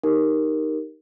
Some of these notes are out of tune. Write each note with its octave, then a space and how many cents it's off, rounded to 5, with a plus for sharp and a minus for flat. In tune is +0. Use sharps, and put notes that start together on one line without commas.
D#4 +0 G4 +0 A#4 +0